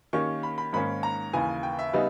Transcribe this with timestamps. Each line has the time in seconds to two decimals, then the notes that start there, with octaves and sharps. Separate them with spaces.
0.13 D#3 A#3 C#4 G4 C#6
0.43 B5
0.58 B5
0.73 G#2 D#3 A#3 C#4 B5
1.03 A#5
1.33 D#2 C#3 E3 G#5
1.63 G5
1.79 E5
1.93 C#3 G3 B3 D#4